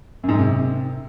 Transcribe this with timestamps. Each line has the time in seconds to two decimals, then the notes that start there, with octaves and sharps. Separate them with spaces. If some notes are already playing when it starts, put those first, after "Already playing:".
0.23 F#2
0.29 G#2
0.34 F#2
0.39 C3